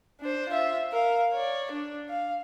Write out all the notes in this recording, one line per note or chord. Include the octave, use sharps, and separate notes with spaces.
D4 C5
F4 E5
A#4 F5
C#5 D5
D4
F5